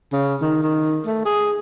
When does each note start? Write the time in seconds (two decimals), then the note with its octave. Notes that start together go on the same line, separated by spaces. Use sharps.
0.13 C#3
0.41 D#3
0.63 D#3
1.06 A3
1.25 G#4